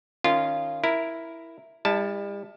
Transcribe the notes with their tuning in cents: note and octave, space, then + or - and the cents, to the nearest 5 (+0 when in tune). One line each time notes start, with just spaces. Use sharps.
D#3 -10 C#4 +0 F4 -20
E4 +0 A#4 +0
G3 +45 E4 +0 A5 +0